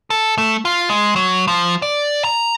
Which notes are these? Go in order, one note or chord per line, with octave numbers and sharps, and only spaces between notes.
A4
A3
F4
G#3
F#3
F3
D5
A#5